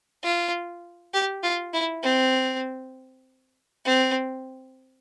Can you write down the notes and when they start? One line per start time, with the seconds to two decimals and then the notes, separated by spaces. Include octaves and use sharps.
0.23 F4
1.14 G4
1.43 F4
1.73 E4
2.03 C4
3.86 C4